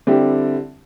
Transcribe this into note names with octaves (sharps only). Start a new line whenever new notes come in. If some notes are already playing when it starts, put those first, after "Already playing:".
D3 G3 C4 E4 G4